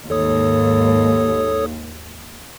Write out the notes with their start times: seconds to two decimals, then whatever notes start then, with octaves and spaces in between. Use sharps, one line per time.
0.10 D#2 G#2 A4 C#5 D#6